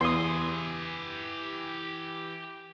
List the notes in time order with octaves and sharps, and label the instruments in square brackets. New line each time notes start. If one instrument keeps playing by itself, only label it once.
[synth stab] E2 [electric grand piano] E3 [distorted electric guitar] G4 G#5 [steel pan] C6 D#6